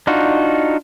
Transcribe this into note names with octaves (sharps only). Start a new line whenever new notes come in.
D4 D#4 F4 F#4